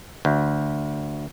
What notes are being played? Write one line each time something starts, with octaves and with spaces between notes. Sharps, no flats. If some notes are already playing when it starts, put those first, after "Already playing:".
D2